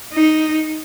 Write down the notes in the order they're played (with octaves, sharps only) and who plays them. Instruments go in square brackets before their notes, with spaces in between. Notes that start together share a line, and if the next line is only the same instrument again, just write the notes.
[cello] D#4